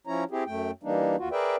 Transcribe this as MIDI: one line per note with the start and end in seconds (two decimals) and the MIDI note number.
0.07 0.24 53
0.07 0.24 61
0.07 0.24 64
0.07 0.24 73
0.07 0.24 82
0.31 0.44 60
0.31 0.44 64
0.31 0.44 67
0.31 0.44 68
0.47 0.71 42
0.47 0.71 57
0.47 0.71 79
0.83 1.16 52
0.83 1.16 55
0.83 1.16 58
0.83 1.16 62
0.83 1.16 63
1.18 1.29 39
1.18 1.29 65
1.18 1.29 66
1.32 1.56 68
1.32 1.56 70
1.32 1.56 71
1.32 1.56 74
1.32 1.56 76
1.32 1.56 79